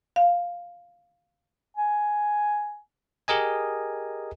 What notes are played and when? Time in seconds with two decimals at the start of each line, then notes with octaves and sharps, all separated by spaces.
0.16 F5
1.77 G#5
3.28 G4 G#4 A#4 D#5 G#5